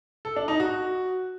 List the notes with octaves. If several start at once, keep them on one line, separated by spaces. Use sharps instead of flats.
A4
D4
D#4
F#4